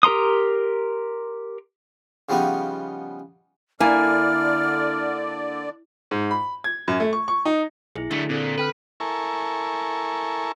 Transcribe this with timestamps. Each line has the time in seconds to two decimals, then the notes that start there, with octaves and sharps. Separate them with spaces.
0.03 G4 A#4 A#5 C6 D#6
2.29 C#3 F3 G3 B3 D#4
3.80 D3 A#3 E4 D5 G#5 F6
6.11 G#2
6.31 B5
6.64 G#6
6.88 F#2
7.00 A3
7.13 C#6
7.28 C#6
7.45 D#4
7.96 B1 E4 G#4
8.11 D3 F#3 A3
8.29 A#2 C4 A4
8.58 A4 B4 G5 F6
9.00 E4 A4 A#4 G#5 C#6